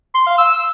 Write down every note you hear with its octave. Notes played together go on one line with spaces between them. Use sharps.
C6
F5
E6